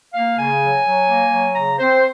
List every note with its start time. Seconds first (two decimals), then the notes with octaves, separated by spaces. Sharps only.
0.14 A#3 F5
0.37 C#3 G#5
0.62 F#3
0.85 F#3
1.08 A#3
1.32 F#3
1.55 C#3 A#5
1.78 C4 C5